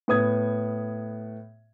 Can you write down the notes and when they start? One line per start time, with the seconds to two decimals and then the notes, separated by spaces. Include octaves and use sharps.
0.08 A2 B3 D#6 G#6